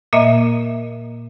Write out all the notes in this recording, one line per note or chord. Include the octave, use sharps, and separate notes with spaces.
A#2 A#3 D#5 E5